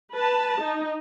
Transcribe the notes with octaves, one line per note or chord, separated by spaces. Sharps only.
B4 A5
D#4